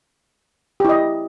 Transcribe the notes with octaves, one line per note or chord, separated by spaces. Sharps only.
E4 G4 D#5